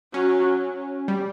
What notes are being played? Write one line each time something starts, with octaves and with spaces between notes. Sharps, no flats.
F#3 C#4
G3